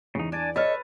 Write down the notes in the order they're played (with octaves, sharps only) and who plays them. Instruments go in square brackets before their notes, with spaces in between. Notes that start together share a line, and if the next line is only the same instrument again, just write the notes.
[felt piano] E2 [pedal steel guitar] C#3 D#4
[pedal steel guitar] D4 G#5 A5 [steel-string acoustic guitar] D5
[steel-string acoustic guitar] A4 C#5 [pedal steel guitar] B4 [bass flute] D#5 [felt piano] F6 A6